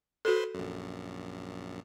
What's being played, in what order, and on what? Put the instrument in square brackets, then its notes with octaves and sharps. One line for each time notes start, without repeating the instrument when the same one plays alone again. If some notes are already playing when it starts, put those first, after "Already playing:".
[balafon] F#4 A4 [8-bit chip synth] B4 C5 C6
[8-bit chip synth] A#1 F#2